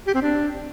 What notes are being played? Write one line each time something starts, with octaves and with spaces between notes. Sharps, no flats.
G4
C4
D4